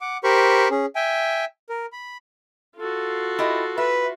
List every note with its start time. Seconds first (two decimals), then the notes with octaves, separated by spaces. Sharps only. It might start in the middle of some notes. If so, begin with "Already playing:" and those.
0.01 F#5 D6
0.24 G4 A#4 C5 B5 C#6
0.70 C#4 G#4
0.96 E5 G5 G#5
1.69 A#4
1.92 B5
2.76 F4 F#4 A4
3.39 E4 G4 D#5
3.78 B4 E5